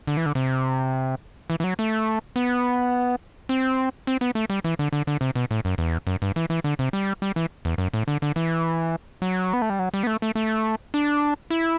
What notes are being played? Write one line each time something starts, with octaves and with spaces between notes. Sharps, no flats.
D3
E3
D3
C3
E3
E3
F#3
A3
B3
C4
C4
B3
A3
G3
E3
D3
D3
D3
C3
B2
A2
F#2
E2
F#2
G2
E3
E3
D3
C3
G3
G3
E3
E2
F#2
A2
D3
D3
E3
F#3
B3
A3
G3
F#3
G3
B3
A3
A3
A3
D4
E4